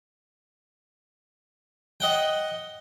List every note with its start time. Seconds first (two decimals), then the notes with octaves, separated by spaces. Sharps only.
2.00 D#5 F#5 G5